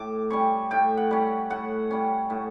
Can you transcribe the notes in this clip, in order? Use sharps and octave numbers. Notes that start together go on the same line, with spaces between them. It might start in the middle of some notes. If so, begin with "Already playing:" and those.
Already playing: A2 D6
G3 C#4 C#6
A2 G5
F#5
G3 C#4
A2 F#5
G3 C#4
A2